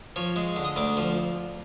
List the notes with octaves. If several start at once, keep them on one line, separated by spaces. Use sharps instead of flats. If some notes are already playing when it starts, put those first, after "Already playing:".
F3 C#5
G#3
D3
D#5
D2 D5
F3